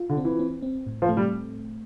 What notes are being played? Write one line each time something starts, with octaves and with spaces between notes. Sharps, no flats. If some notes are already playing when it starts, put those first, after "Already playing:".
Already playing: F4
D3
C4
E3
C4
C4
A2
F3
A3
G3